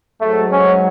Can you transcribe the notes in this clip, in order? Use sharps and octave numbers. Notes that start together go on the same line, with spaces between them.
G#2 F#3 A3
C#4